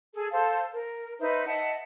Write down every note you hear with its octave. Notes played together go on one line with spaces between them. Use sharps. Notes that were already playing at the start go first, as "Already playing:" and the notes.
G#4 A4
A4 C5 F5 A5
A#4
D#4 B4 C5 E5
D#5 E5 F#5 A5